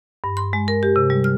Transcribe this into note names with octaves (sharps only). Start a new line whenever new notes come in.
G2
C6
G#3
A#4
G4
C3
G3
F6